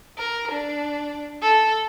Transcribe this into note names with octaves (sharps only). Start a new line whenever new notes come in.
A#4
D4
A4